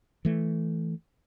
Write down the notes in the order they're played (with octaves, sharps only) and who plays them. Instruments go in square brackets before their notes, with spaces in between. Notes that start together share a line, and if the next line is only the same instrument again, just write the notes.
[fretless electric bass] E3 A3